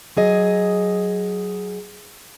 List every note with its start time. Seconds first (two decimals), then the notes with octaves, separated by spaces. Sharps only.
0.17 F#3 G#4 D#5